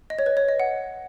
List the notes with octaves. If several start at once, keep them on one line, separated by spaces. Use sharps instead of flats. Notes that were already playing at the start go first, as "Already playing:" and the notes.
D#5
C#5
B4
C#5
D#5
F#5